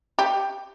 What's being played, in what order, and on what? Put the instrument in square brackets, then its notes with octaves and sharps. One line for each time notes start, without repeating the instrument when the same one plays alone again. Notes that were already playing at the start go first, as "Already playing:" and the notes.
[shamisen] G4